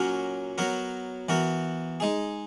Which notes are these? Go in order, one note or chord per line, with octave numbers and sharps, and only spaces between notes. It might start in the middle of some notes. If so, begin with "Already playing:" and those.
Already playing: A#2 F#3 C#4 F#4 A#4
F#3 B3 F#4 A#4
E3 B3 F#4 A#4
G#3 D#4 G#4